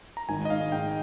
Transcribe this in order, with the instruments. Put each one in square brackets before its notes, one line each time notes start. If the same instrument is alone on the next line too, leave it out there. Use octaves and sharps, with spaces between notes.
[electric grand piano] A#5
[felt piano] G#1 [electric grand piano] G#5
[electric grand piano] D#5
[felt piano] G#2 [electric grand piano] F5
[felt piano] G#2 [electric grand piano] G5